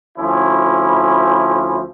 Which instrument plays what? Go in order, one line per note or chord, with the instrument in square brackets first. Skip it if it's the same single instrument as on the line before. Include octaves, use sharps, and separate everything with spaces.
[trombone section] D2 F3 C#4 E4